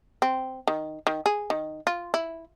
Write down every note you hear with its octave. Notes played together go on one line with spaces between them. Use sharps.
C4
D#3
D#3
G#4
D#3
F4
E4